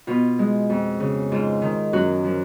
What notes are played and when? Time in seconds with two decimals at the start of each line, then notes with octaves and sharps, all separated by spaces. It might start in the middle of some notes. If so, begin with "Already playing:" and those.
0.07 B2 F4
0.39 G#3
0.70 F2
1.00 C#3
1.32 G#2 F4
1.62 D#3
1.93 F#2 F#4
2.24 F3